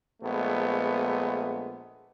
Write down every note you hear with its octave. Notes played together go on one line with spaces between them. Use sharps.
A#1 G#3 A3 B3